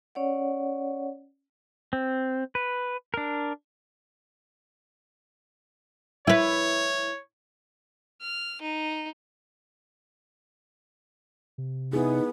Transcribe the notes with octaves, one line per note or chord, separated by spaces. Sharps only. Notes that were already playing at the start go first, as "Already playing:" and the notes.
C#4 C#5 D5 F#5
C4
B4
D4 A#4
E4 B4 C#5
F6
D#4
C3
B3 D#4 E4 G#4